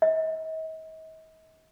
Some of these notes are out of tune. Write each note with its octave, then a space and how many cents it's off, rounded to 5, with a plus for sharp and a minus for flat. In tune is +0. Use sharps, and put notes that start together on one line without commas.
D#5 +45